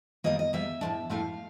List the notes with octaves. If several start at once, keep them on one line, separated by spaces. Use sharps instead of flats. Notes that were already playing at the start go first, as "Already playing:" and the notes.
D#3 G3 A#3 D#5
D#5
D#3 G3 A#3 E5
A2 F3 A3 D4
A2 F3 A3 D4 F5